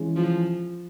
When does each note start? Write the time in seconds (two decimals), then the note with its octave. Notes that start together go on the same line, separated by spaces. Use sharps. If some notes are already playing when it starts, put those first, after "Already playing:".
Already playing: E3 G#3 C#4
0.16 F3